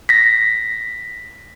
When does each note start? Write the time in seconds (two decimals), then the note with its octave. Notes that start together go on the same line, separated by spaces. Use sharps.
0.09 A#6 B6